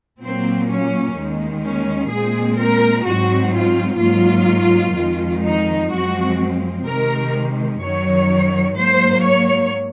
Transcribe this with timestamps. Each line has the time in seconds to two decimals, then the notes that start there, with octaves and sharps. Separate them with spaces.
0.20 A#2 F#3 A#3 C4
0.68 C#4
1.15 D#2 D#3 G#3
1.63 C#4
2.11 A#2 G#3 C4 G#4
2.58 A#4
3.06 G#2 F#3 C4 F#4
3.53 F4
4.00 G#2 F#3 A#3 F4
4.95 F2 D#3 G#3
5.43 D#4
5.91 F#2 F3 G#3 C4 F#4
6.86 C3 D#3 G#3 A#4
7.81 F#2 D#3 F#3 C#5
8.76 G#2 F#3 A#3 C5
9.23 C#5